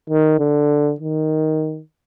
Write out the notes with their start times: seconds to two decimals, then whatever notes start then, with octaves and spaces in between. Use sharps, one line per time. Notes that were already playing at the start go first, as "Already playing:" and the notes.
0.10 D#3
0.39 D3
1.00 D#3